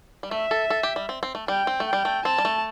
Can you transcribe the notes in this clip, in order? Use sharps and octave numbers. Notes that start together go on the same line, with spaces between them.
G3
A3 E5
A4
A4
G4
G3
C4
C4
A3
G3 G5
C4
A3
G5
G3
A3
C4 A5
G3
A3